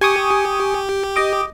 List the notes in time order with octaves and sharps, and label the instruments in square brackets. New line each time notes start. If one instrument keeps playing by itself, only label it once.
[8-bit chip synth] G4 [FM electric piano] G#5 C#6 D#6
[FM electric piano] D#5 D6